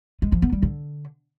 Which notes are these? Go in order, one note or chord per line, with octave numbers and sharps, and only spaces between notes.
G#3
F3
B3
G3
D3